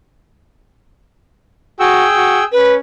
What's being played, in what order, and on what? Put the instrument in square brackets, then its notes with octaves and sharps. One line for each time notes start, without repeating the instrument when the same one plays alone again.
[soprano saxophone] F#4 [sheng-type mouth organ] G#4 G5 E6
[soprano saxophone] F#4
[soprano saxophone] C#4 [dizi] B4